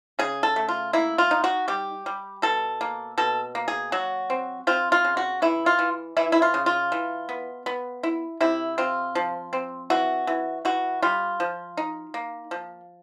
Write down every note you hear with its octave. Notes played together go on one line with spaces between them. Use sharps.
C#3 G#4
A4
A3
F4
A#3 E4
F4
D#4
F#4
G3 G4
G3
B2 A4
A#3
B2 A4
A#3
G#4
F#3 F#4
C4
C4 F4
F4
C#3
F#4
E3 E4
F4
E3
E3 E4
E4
F4
C#3
F4
E3
B3
B3
E4
C3 E4
C4 F4
F3
C4
E3 F#4
E3
E3 F#4
G3 F4
F3
D#4
A#3
F3